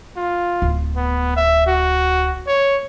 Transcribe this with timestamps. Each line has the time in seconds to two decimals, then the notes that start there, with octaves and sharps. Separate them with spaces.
0.16 F4
0.62 D1
0.96 B3
1.36 E5
1.67 F#4
2.47 C#5